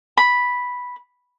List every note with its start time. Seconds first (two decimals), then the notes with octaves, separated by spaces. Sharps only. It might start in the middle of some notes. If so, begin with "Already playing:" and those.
0.17 B5